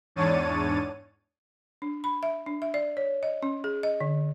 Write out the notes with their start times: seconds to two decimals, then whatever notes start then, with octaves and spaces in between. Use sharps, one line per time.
0.16 E2 G#2 D4 C#5 A6 D#7
1.82 D4
2.04 B5
2.23 E5
2.46 D4
2.62 E5
2.74 D5
2.97 C#5
3.23 D#5
3.43 C#4
3.64 G#4
3.83 D#5
4.01 D3